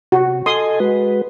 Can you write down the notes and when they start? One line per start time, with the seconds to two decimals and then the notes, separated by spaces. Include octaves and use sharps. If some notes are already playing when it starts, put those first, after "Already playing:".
0.12 C3 F#4
0.46 A4 D#5 G#5 C6 D#6
0.80 G#3 F#4 B4